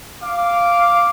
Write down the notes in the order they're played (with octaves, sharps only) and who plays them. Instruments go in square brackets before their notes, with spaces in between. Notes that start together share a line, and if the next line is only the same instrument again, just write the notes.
[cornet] F5 [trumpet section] D6